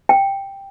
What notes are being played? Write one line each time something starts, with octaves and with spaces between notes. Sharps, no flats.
G5